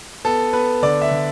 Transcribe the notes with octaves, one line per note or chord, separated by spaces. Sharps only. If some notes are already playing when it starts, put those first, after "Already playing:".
B3 A4
B3 B4
D3 D5
E5
D3